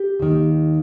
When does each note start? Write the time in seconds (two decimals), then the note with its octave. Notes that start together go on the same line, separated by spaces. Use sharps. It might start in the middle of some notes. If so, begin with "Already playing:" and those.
Already playing: G4
0.20 D#2 D#3